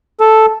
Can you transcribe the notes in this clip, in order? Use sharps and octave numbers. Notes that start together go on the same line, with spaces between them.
A4